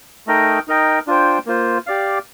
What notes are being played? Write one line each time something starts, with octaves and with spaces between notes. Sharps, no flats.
A3 D#4 A#4 D#5 G5
D#4 A#4 D#5 G5
D4 F4 C5 G5
A#3 F4 C5
G4 D5 F5